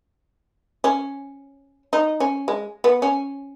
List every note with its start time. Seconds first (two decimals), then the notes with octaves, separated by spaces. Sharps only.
0.84 C#4
1.93 D#4
2.20 C#4
2.48 G#3
2.84 B3
3.02 C#4